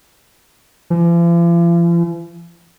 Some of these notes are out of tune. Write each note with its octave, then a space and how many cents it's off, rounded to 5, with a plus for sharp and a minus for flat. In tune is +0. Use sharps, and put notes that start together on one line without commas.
F3 -45